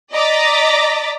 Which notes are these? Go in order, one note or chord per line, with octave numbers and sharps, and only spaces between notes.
D5 D#5 A#5 D6 A6 B6